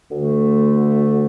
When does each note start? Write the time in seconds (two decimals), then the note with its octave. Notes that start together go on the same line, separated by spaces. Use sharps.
0.09 D2 D3 A3